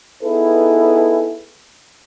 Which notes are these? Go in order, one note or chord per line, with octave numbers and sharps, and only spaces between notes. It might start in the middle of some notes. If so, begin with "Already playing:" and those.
B3 D#4 E4 G#4 A4 B4